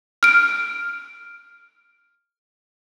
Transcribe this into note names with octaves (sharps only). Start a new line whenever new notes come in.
F6 D7